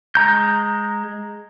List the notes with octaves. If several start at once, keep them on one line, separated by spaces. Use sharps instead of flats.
G#3 A#5 G6